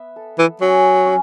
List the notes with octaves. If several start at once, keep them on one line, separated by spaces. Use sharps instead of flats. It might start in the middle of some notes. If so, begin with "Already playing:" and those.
Already playing: B3 E5
A4
E3
F#3 C#4
C#4